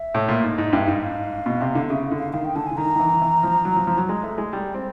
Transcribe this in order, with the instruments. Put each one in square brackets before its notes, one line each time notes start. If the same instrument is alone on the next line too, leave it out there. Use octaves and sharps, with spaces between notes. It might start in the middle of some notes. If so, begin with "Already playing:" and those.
Already playing: [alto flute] E5
[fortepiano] A2
A#2
G#2
G#2
[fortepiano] G2 [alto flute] E5
[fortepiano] G#2 [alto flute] F5
[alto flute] F5
[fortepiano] B2
C3
D3
[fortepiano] C#3 [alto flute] E5
[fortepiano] D3
[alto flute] F5
[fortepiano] D#3 [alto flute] F5
[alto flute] G5
[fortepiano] D3 [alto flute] A5
[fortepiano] D3 [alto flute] G#5
[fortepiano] D#3 [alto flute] A#5
[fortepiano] D#3
E3
E3
F3
F#3
F3
F3
F#3
G#3
A3
G#3
G3
C4